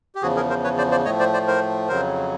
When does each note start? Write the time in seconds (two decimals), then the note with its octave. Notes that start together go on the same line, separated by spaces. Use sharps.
0.15 G4
0.22 E2 C#3 F3 F#4 G#4
0.36 G#4 A#4
0.49 A#4 C5
0.64 B4 C#5
0.78 C5 D5
0.91 C5 D5
1.05 A2 F3 A3 C#5 D#5
1.19 C5 D5
1.33 C5 D5
1.47 A#4 C5
1.89 F2 C#3 F#3 A#4 C5